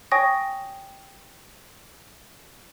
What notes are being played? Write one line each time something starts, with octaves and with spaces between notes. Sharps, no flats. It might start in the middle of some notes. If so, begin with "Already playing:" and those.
C#5 G5 G#5 C#6 D#6 A#6